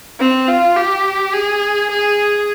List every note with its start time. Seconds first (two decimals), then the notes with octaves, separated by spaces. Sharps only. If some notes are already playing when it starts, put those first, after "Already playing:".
0.19 C4
0.48 F4
0.76 G4
1.33 G#4
1.90 G#4